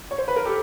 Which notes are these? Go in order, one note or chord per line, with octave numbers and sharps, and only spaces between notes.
C#5
C5
B4
A#4
G4 A4